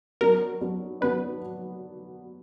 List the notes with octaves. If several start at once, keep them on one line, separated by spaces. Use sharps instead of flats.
F#3 B3 D4 A#4
F#3 B3 D4
F#3 B3 D4 B4